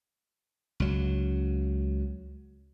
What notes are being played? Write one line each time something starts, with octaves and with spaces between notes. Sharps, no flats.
C#2 F#3